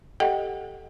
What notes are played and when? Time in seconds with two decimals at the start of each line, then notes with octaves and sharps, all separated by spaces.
0.20 G4 A4 D#5 F#5 G5